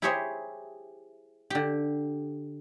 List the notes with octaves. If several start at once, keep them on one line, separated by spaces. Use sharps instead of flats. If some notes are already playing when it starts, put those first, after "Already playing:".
E4 G4 G#4 C5 C#5 E5
D3 G4